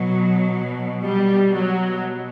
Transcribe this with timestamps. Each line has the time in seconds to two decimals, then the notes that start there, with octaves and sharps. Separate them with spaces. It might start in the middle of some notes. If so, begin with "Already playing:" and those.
Already playing: B2 F#3
1.06 G3
1.55 B2 F#3